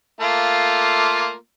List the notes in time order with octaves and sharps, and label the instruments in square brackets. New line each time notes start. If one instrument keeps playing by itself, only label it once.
[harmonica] A3 A#3 F4